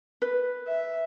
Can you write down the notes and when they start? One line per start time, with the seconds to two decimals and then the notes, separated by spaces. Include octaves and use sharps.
0.22 B4
0.67 E5